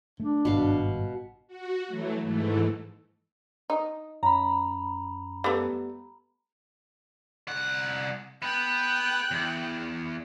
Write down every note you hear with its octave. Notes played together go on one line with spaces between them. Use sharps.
A3 D4
G#1 G2 B2 F5
F#4
E3 F#3 A3
G#2 E3 A3
D#4
F#2 A#5 B5
G3 A3 B3
C2 F#5
B3 G5 F#6
E2